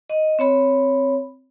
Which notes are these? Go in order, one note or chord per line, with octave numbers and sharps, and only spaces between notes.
D#5
C4 C#5 B5